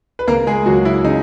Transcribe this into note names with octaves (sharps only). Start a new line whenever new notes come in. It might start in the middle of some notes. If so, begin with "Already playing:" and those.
B4
C#2 A#3 A#4
G#3 G#4
C#2 F#3 F#4
E4
C#3 D#4